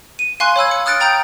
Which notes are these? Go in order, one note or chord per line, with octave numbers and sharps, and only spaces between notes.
D#7
F5 G#5 C6 C#6 F#6
C#5 B5 E6 G#6
C#7
D#6 F6 F#6 A6 C#7 D7
G5 A#5 D#6 G6